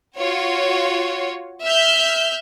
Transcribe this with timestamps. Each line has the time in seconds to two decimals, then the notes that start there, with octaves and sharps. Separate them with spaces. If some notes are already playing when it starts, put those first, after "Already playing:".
0.16 F4 F#4 C#5
1.64 E5 F6 G6